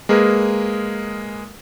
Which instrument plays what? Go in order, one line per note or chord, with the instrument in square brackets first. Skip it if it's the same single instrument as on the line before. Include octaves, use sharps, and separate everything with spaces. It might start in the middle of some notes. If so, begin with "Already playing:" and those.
[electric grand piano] G#3 A#3 G#4 A#4 B4